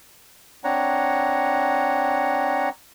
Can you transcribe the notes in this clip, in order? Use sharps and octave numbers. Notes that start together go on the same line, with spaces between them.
C4 D4 C#5 F#5 A#5